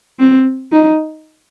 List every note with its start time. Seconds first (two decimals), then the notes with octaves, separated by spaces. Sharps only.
0.20 C4
0.72 D#4